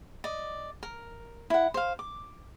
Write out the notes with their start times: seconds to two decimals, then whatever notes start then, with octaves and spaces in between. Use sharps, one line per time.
0.24 D5 D#5
0.83 A#4
1.50 E4 F#5
1.74 C5 F5
1.99 D6